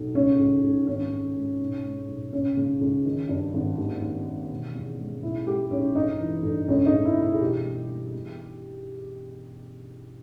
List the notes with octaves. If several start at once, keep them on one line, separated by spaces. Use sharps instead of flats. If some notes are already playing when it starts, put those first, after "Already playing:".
Already playing: B1
C#2 C#4
C#2
C#2
G#1 C#4
G#1
G#2
B1
G#3
B1
C#2 C#4
C#3
C#2
D#3
G2
G#1
D#2
D#2
D#2
E1
E2
G#3
B1 E4
G#3 G4
B1 C#4
G1 D#4
E3
G1
C#2 C#4
D#4
C#2
E4
B2
E4
G#4
E1 G4
G3
G3
E2